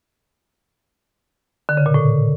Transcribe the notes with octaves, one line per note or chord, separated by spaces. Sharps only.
D3
C#3
A#2
A2